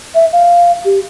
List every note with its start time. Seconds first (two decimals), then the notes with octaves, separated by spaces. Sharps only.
0.15 E5
0.33 F5
0.85 G4